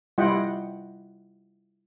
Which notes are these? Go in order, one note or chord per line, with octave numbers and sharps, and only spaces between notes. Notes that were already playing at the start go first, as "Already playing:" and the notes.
G3 E4 F4 D#5 F#5 G5